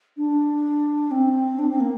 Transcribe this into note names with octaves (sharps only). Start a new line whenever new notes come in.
D4
C4
D4
C4
A#3